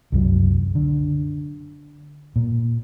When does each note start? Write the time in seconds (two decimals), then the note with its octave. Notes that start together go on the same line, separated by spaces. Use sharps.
0.12 C2 F#2 F#3
0.75 D3
2.36 A#2